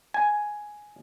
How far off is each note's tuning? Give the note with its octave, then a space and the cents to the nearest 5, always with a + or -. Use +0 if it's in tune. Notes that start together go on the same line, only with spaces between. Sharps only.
G#5 +5